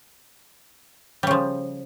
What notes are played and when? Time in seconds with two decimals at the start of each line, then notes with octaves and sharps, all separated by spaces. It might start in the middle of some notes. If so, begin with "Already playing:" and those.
1.23 G3
1.27 C#3
1.31 F3